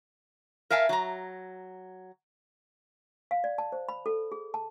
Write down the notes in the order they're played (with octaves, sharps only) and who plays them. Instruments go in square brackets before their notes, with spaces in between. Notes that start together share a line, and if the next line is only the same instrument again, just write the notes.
[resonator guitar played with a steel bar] A#4 E5 F5 G#5 A5
F#3 A#5
[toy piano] F5
D5
A5
C5
B5
A4
G#4
A5